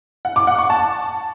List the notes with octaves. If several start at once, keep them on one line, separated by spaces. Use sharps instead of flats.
F#5
D6
F#5
C#6
A5